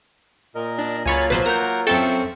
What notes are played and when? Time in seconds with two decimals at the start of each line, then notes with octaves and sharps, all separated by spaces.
0.55 A#2 A#4 D#5
0.79 D4
1.06 C#2 F#3 A#3 F4 C#5 G#5 B5 A6
1.30 A#1 B2 F3 B4 C5
1.46 A#4 F#5 A#5 G6
1.87 F#2 C4 F4 A4 E5 G5 C#6